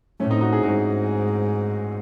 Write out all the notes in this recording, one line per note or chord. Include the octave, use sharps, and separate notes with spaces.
A2 A3 C#4
C4 D#4
D#4 F#4
E4 G#4
G#2 D#4 F#4